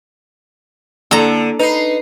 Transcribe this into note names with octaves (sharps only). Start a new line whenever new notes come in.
D3 A#3 E4 A4 A#5
D#4 B4 B5 C7 F7